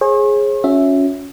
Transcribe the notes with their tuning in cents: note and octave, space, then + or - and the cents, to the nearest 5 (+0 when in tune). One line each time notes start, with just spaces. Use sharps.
G#4 +0 C#5 -45
C#4 +10 F#4 -30 E5 +0